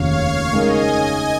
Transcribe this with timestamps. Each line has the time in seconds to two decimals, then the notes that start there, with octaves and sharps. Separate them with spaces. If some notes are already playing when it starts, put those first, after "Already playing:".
Already playing: F1 D#2 C#3 F3 C#5 F5
0.16 C#5 F5
0.53 C#3 G#3 D#4 A#4 C#5 D#5 G#5